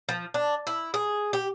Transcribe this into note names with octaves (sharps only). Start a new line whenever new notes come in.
F3
D4
E4
G#4
G4